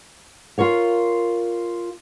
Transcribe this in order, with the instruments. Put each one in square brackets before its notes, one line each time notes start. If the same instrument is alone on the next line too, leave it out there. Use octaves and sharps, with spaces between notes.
[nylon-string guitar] F4 A#4 C#5 F5